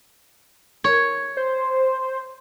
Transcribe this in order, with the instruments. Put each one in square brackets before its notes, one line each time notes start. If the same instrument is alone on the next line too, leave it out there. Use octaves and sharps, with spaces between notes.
[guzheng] C#5
[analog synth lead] C5